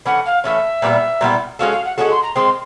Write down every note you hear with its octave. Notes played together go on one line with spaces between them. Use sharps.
E3 A3 C#4 F#5
F5
E3 A3 C#4 E5
A#2 G3 B3 E4
A#2 G3 B3 E4
G#3 C#4 F#4 A4 F5
F5
F#5
G#3 C#4 F#4 A4 F#5
C6
A#5
D#3 G#3 C4 C6